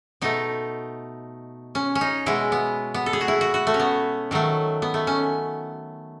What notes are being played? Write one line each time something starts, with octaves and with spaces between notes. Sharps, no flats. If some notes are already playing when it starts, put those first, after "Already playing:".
B2 A3 D#4
C#4
C#4
D#4
B2 G#3 E4
B3
B3
A4
G#4
F#4
E4
F#4
F#4
A3
C#4
B3
D#3 F#3 A3
B3
A3
C#4